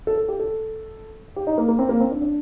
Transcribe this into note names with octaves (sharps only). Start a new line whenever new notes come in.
A4
A4
G4
A4
G4
D#4
A#3
A#3
C4
A#3
C4
D4
D4